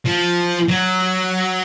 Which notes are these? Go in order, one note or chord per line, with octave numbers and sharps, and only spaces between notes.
F3
F#3